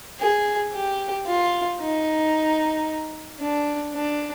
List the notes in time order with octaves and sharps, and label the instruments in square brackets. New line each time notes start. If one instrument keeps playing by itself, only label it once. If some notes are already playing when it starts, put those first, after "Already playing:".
[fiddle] G#4
G4
F4
D#4
D4
D4